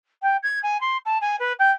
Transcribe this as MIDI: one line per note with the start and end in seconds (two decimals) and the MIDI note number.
0.22 0.37 79
0.42 0.59 92
0.63 0.80 80
0.80 0.97 84
1.05 1.18 81
1.21 1.36 80
1.39 1.52 71
1.59 1.71 79